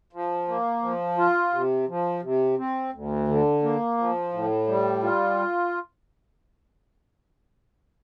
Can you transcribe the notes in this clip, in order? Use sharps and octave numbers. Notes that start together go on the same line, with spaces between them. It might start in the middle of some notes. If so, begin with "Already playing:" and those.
F3
A#3
F3
F4
C3
F3
C3
C4
D2
D3
A#3
F3
A2
G3
F4